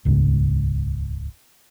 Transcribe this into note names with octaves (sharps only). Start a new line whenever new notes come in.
D#1 C#2 G#2 C#3